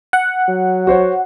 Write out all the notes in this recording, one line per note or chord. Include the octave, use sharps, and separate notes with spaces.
F#5
F#3
F#4 C5 C#5